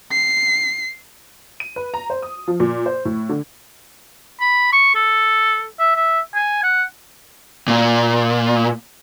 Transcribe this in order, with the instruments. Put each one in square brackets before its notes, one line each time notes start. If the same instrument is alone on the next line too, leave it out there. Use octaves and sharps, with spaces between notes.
[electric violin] C7
[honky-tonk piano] D#7
B4
A#5
C5
D#6
F3
A#2
C5
A2
D3
[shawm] B5
C#6
A4
E5
E5
G#5
F#5
[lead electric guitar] A#2